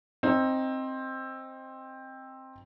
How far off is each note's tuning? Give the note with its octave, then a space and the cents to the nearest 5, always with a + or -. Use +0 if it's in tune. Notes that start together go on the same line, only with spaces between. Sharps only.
C4 +10 D#4 +0